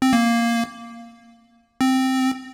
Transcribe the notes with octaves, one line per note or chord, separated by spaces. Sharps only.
C4
A#3
C4